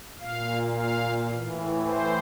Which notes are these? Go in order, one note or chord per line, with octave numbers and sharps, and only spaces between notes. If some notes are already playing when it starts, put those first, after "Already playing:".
A#2 F5
F5
A2 E3
C5